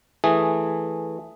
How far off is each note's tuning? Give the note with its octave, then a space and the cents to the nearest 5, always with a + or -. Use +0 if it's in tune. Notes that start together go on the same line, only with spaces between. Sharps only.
E3 +0 A3 +0 G#4 -5